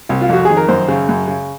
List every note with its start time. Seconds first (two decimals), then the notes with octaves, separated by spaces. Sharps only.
0.09 C2
0.21 F4
0.29 F2 F#4
0.45 D#3 G#4
0.57 A#4
0.68 F#2 C5
0.88 C#3
1.09 F#2
1.28 C#3